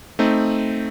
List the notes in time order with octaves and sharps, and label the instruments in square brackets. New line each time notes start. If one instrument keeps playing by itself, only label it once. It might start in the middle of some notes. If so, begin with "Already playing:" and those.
[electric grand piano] A3 C4 D#4